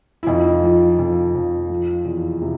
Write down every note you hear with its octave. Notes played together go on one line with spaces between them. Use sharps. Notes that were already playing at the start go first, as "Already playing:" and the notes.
E4
F2 D#4 F4
F3
F2
F2
F3
E2
C3